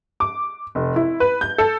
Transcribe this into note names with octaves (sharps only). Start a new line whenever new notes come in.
D6
F1
E4
B4
G6
A4